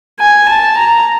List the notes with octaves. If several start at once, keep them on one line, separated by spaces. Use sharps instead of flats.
G#5
A5
A#5